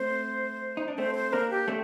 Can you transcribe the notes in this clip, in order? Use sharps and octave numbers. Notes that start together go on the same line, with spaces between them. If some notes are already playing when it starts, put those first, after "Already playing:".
Already playing: A3 C4 C5
D#4
D4
A3 C4 C5
C5
A#3 D4 A#4
G4
A3 C4